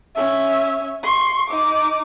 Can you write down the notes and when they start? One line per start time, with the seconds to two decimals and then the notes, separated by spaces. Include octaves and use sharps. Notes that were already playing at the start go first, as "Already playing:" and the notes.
0.15 C#4 E5
1.03 C6 C#6
1.49 D#4 D6